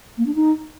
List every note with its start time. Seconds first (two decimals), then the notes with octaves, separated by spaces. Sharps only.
0.17 A#3
0.26 D4
0.34 D#4